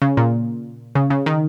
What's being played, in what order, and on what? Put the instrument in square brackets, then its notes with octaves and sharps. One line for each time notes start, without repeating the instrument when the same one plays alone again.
[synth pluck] C#3
A#2
C#3
C#3
D#3